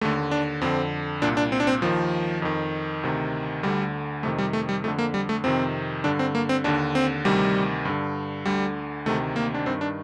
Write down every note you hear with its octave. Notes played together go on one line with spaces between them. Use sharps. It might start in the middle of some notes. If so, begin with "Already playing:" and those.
D#2 D3 A3
D4
F2 D3 C4
C2 A#2 D4
D4
C4
D4
C4
D#2 D#3 F3
F2 D#3
D2 C3 D#3
D2 D3 G3
F2 C3 D#3 A3
G3
A3
G3
F2 D3 A3
A#3
G3
A3
F2 C3 D#3 C4
G2 D3 D4
C4
A#3
C4
D#2 D3 D4
C4
D2 C3 D#3 G3
G2 D3
D2 D3 G3
D2 C3 D#3 A3
A#3
D4
G2 D#3 C4
D4